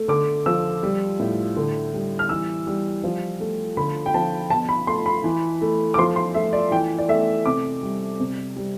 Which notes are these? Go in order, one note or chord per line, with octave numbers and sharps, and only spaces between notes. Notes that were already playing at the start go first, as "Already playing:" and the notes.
Already playing: A3
D3 D6
F3 E6
G3
A2
D3
G3
F6
E3 E6
G3
F3
A3
D3 B5
G5
F3 A5
B2 A5
B5
A3 C6
B5
E3
A3
D6
F3 C6
C6
A3 E5
D5
E3 G5
D5
A3 E5
C3 D6
G3
C3
G3